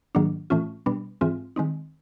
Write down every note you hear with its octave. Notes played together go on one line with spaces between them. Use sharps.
G#2 D#3 F#3 A#3 D4
A2 E3 A3 C#4 F4
B2 G3 B3 D4
G#2 E3 G#3 C4 F4
D#3 G#3 C4 D#4